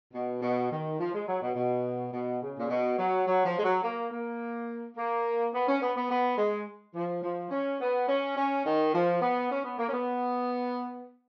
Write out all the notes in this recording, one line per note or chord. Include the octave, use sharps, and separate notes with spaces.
B2
B2
D#3
F3
G#3
F#3
B2
B2
B2
C#3
A#2
B2
F#3
F#3
F3
G#3
F#3
A#3
A#3
A#3
B3
C#4
B3
B3
B3
G#3
F3
F3
C#4
B3
C#4
C#4
D#3
F3
B3
C#4
B3
A#3
C#4
B3